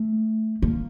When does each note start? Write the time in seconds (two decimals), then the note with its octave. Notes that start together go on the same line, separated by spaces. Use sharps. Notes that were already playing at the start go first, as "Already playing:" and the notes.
Already playing: A3
0.62 A#3